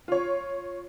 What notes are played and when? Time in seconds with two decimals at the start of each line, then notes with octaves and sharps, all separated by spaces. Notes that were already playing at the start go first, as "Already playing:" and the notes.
0.08 F4 C#5